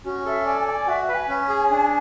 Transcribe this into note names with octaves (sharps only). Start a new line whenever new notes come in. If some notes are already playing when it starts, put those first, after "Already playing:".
C#4 F#4
A4 E5
D5 G#5
G#5
D5
G#5
F#4 E5
E5
B4
G#5
C#4
G#4
D4